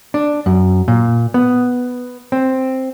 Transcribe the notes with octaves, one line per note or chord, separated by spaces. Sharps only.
D4
F#2
A#2
B3
C4